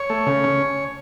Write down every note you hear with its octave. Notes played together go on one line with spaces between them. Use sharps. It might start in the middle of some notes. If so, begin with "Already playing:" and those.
Already playing: C#5
A3
C#3
C#4